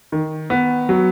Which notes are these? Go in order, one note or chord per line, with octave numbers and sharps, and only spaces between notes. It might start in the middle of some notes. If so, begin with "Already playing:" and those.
D#3
B3
F#3